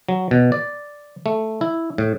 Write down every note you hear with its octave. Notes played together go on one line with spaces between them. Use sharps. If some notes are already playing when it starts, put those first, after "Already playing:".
F#3
B2
D5
A3
E4
A2